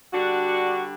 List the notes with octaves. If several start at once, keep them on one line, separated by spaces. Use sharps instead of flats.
D3 G3 D4 F#4